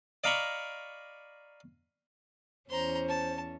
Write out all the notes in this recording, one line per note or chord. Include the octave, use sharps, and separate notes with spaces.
D5 D#5 F5 A#5 B5 C#6
E2 C#4 C5 A#5 C6
A5